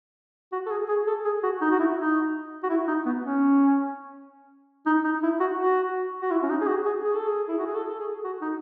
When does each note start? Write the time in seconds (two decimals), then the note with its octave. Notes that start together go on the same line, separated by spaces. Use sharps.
0.52 F#4
0.66 A4
0.70 G#4
0.89 G#4
1.07 A4
1.25 G#4
1.43 F#4
1.61 D#4
1.71 F#4
1.79 E4
1.97 D#4
2.63 F#4
2.70 E4
2.88 D#4
3.06 B3
3.24 C#4
4.86 D#4
5.04 D#4
5.23 E4
5.40 F#4
5.59 F#4
6.22 F#4
6.31 E4
6.43 C#4
6.50 D#4
6.61 G#4
6.68 F#4
6.86 G#4
7.04 G#4
7.16 A4
7.28 G#4
7.48 E4
7.58 F#4
7.66 G#4
7.75 A4
7.89 A4
7.99 G#4
8.24 F#4
8.41 D#4